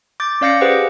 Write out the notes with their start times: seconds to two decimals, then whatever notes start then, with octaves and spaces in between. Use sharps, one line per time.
0.20 D6 G6 A6
0.41 C#4 D5 F5 G6 A#6 C#7
0.61 G4 G#4 B4 C5 F#5